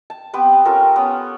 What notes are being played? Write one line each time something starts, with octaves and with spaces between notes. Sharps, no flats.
A5
B3 C4 G4 B4
C#4 F4 A4 A#4
B3 C#4